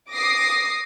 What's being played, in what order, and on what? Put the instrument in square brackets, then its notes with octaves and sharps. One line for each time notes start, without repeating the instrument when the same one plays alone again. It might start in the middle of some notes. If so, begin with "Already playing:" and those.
[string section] D6 D#6 A#6 C7